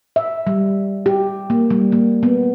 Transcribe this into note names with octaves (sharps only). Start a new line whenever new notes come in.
E5
G3
G4
A#3
G3
A#3
B3